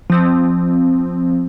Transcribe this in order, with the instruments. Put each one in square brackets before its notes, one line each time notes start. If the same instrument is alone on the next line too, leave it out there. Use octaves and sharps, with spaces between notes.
[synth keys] F3 C4